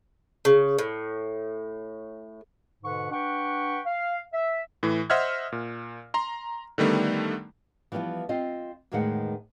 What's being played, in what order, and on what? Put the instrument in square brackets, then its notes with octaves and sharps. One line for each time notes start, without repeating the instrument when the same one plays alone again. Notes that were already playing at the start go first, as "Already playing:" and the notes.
[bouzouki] C#3
A2
[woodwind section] G#2 B2 D3 B4 F#5 C#6
D4 B4 F#5 G5 C#6
F5
E5
[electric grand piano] A2 E3
C5 D#5 E5 F#5 F6 G#6
A#2
A#5 C6
D3 D#3 G3 A3 B3
[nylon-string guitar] E3 F3 G3 B3 E4
C4 F4 D#5
E2 A2 D#3 G#3 B3 F#5